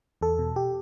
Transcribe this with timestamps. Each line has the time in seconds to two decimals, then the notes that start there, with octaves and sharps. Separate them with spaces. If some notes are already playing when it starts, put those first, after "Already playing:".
0.21 E2 A4
0.39 B2
0.56 G4